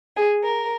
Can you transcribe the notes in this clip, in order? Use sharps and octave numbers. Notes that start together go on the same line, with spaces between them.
G#4
A#4